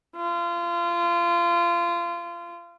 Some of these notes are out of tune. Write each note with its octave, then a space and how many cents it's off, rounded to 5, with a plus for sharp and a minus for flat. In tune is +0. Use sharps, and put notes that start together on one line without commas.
F4 -25